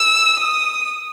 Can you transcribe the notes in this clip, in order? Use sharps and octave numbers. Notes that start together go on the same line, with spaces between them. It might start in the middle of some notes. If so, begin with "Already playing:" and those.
Already playing: E6
D#6